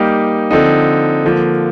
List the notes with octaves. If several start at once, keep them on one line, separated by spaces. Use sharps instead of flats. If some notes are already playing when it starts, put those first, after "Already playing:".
Already playing: G3 A#3 D#4 G4
D3 F3 C4 D#4
D3 F3 A#3